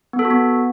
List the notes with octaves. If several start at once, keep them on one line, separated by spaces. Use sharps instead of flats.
B3
A4
F#4
B3